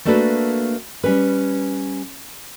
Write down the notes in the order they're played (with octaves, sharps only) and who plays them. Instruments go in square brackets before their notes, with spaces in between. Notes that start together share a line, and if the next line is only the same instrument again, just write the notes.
[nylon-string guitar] A3 A#3 D4 F#4 A4 B4
G3 C#4 B4